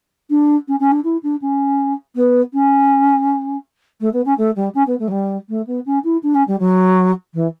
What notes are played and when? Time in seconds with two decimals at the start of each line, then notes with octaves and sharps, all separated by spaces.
0.30 D4
0.68 C#4
0.80 C#4
0.92 D4
1.04 E4
1.23 D4
1.42 C#4
2.15 B3
2.53 C#4
4.01 A3
4.13 B3
4.25 C#4
4.38 A3
4.56 G3
4.75 C#4
4.87 B3
4.99 A3
5.08 F#3
5.11 G3
5.49 A3
5.67 B3
5.86 C#4
6.04 E4
6.23 D4
6.35 C#4
6.48 G3
6.60 F#3
7.34 E3